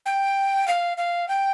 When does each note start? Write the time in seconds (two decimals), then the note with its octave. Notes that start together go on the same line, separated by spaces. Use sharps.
0.06 G5
0.67 F5
0.97 F5
1.28 G5